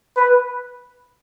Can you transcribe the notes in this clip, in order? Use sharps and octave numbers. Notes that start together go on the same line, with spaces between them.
B4